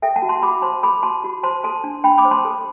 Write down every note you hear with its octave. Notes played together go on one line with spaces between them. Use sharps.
A4 E5 G5
F#5 A5
F#4
A5 C6
F#4 B5 D6
C5 A5 C6
A4 B5 D6
F#4 A5 C6
F#4
C5 A5 C6
A4 A5 C6
D4
D4 G5 B5
B5 D6
C5
A5 C6
A4